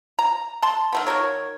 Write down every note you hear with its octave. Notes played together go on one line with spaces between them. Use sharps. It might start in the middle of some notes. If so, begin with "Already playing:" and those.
A#5
A5 C6
D#3 A3 B3
D#3 F#4 A#4 C#5